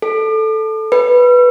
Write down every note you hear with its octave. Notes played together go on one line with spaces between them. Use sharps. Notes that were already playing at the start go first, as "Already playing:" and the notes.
A4
B4